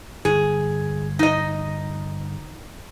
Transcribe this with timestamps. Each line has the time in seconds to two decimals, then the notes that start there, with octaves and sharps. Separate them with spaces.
0.25 G1 G#4
1.19 D#4 D#5